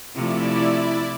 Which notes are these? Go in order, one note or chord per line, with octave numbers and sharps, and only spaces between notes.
C3 F3 A3 E4 D5